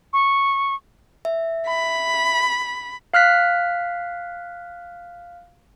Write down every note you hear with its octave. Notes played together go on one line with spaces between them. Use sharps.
C#6
E5
B5
F5 F6 F#6 B6